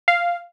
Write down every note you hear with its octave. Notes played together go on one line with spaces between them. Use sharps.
F5